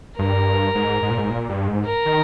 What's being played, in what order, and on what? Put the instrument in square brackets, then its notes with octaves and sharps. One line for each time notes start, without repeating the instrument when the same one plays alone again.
[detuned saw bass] G2 [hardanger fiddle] A#4
[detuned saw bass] G#2
G#2
A#2
G#2
A#2
G2
G#2
[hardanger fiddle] A#4
[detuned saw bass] D#3